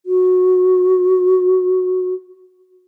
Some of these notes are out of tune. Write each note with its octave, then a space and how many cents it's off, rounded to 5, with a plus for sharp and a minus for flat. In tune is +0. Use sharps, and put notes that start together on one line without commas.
F#4 -10